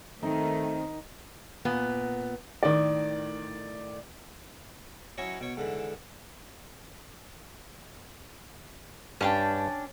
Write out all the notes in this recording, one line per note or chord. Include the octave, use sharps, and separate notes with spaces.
D#3 A3 C4 D#4
A#2 B3
A2 D#3 D5
F#3 C#4 E4 C#5 D#5
B2 C#5
G#2 D3 E3
G2 C#4 D4 G4 G5